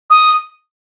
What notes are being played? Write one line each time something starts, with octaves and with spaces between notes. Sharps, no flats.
D#6